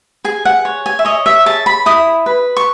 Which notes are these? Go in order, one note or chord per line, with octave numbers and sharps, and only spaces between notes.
G#4 G#5
F#5
C#5
G#5
E5
C#5 D#5
E5
G#4 A5
B5
E4 D#6
B4
C#6